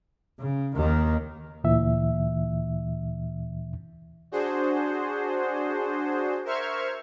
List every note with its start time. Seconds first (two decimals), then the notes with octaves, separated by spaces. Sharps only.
0.40 C#3
0.76 D#2 D#3
1.64 D2 A#2 E3 E5
4.31 D4 F#4 G#4 C5
6.45 A#4 C5 E5 C#6 F6 G#6